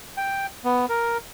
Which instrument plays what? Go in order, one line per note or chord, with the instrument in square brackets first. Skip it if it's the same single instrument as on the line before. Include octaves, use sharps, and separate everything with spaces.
[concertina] G5
B3
A#4